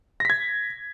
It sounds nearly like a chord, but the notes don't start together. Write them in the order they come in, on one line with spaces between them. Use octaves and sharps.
A#6 B6 G#6